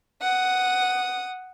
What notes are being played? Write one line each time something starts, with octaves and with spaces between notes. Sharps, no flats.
F#5 D#6